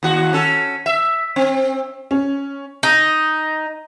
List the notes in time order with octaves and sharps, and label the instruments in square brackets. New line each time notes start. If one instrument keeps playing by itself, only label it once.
[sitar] D#2 F#4
C#4 A4
E5
C4
[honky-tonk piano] C#4
[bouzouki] D#4